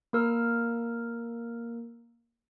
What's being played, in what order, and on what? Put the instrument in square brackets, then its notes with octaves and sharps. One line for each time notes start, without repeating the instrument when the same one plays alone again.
[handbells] A#3 A#4 E6 F6